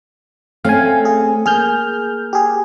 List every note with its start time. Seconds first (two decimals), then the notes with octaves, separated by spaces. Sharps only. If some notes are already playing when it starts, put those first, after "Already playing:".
0.64 A3 C4 C#4 F5 G#5
1.05 G#4
1.46 A#3 G#4 F6 G6
2.33 G4 G#4